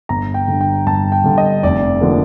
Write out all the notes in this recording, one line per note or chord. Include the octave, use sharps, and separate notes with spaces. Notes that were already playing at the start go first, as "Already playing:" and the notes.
G1 A#5
G5
G2 D3
G5
G1 A5
G5
G2 D3
D#5
F1 D5
D3 F3 A#3